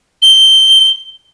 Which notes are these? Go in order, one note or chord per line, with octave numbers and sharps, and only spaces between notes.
G7